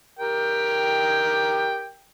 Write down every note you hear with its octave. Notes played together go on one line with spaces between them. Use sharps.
G4 A#4 G5